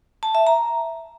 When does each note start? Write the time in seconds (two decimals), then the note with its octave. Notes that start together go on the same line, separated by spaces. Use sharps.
0.23 A5
0.35 E5
0.47 A#5